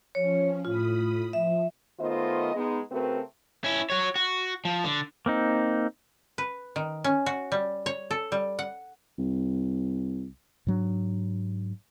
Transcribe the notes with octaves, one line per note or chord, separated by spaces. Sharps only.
F3 C#4 C#5
A2 F4 B5 D#6
F3 E5
D#3 A3 B3 F4 C5 D#5
G#3 B3 D#4
C#3 A3 C4 F#4 A#4 B4
C#4 E4
F#4 C#5
F#4
F3
D3
A#3 C4 D#4
B4
D#3
C#4
F#4
G3
C#5
A4
G3
F#5
C2
G#2 F#3 D4